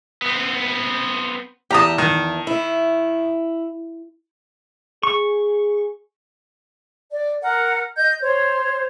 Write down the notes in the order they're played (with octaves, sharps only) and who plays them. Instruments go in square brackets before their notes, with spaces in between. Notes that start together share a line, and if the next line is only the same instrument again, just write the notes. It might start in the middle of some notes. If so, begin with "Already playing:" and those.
[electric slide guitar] B3 C4
[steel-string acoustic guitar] E2 A5 [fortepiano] G4 A#5 D#6
[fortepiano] D#3
[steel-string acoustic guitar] E4
[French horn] G#4 [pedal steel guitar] C#6
[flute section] D5
A#4 F#5
D#5 G6
C5 C#5